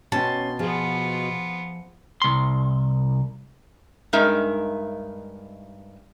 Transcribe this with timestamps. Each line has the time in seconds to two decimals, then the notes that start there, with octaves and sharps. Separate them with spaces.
0.12 B2 C#4 G5 A5 C6
0.59 F3 B3 F4 G#4
2.22 C2 C6
4.13 G2 G#3 D#4 A#4 E5